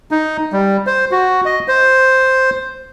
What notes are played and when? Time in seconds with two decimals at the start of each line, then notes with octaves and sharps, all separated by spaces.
0.11 D#4
0.53 G3
0.87 C5
1.11 F#4
1.45 D#5
1.68 C5